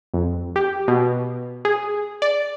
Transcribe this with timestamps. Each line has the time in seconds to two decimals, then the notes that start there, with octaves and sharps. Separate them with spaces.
0.14 F2
0.56 G4
0.88 B2
1.65 G#4
2.22 D5